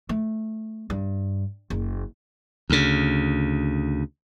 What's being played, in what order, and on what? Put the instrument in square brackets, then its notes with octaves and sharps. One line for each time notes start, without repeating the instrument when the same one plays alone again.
[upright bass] A3
G2
F#1
[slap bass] D2 C#3